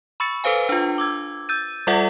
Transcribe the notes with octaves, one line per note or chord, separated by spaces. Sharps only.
B5 C#6 E6 A6 C#7
A4 B4 C5 F5 G#5
D4 F4
D6 E6 G#6
E6 G6 A6 D#7
G3 F4 A4 D5 E5 F#5